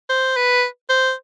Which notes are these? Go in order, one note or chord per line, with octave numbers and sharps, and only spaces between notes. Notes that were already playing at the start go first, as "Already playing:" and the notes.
C5
B4
C5